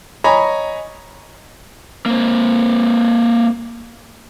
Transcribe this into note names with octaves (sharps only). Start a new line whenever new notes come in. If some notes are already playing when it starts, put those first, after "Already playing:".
C#5 D#5 G#5 A#5 B5
A#3 C4